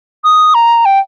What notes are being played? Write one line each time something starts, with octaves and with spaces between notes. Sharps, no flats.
D#6
A#5
G5